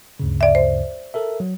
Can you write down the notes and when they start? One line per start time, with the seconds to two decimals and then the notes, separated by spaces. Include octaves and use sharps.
0.20 D2 G2 C#3
0.41 D5 E5
0.55 C5
1.14 A4 A#4 E5
1.40 F#3